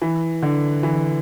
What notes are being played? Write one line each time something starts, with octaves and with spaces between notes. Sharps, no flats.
E3
D3
E3